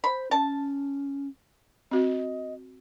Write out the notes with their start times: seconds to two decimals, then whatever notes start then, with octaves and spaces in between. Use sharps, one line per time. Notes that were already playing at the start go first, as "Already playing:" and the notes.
0.04 C5 B5
0.31 C#4 A5
1.91 C4 F#4 D#5